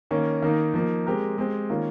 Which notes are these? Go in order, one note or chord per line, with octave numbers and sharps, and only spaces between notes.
D#3 A#3 C#4
D#3 A#3 D#4
F3 A#3 D#4
G#3 C4 G4 A#4
G#3 C4 G4
D#3 A#3 C#4 F4